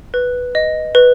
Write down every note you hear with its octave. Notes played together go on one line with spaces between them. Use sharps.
B4
D#5
B4